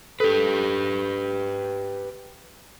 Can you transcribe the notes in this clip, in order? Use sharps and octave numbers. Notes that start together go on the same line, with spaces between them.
G4 A4 B4